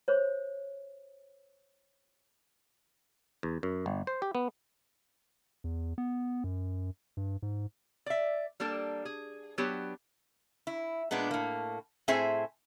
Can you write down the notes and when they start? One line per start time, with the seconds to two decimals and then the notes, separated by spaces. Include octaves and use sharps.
0.08 C5 C#5
3.43 E2
3.63 F#2
3.86 G1
4.07 C5
4.22 G4
4.35 B3
5.64 E2
5.98 B3
6.44 F#2
7.17 G2
7.42 G#2
8.06 D5 E5
8.60 G3 A#3 D4 A4
9.05 G#4
9.58 F#3 B3 D4 G4
10.67 E4
11.11 A#2 G#3 B3 D4
11.31 A2 A#3
12.08 A2 C4 G#4 C5 E5 G#5